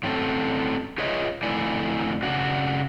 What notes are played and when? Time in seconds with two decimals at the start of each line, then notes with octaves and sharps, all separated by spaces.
0.03 A2 F#3 C4 C#4 A4
0.98 F4 G#4 B4 C#5 D#5 E5
1.43 F2 D3 A3 E4 D5 G#5
2.23 C#3 D4 F#4